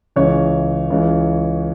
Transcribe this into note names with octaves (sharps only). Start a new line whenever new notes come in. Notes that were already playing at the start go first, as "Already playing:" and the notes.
C#2 C#3 E3 C#5
C#2 C#3 E3